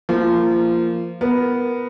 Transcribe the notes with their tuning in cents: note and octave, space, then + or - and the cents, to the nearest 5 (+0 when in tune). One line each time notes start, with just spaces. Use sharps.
F3 -30 A#3 -20
B3 +0 A#4 +0